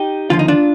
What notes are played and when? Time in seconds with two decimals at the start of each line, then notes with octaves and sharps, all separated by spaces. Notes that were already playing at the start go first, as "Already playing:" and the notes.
Already playing: D#4 G4
0.30 D#2 D3 F3 F4
0.39 D#4
0.48 D4 F4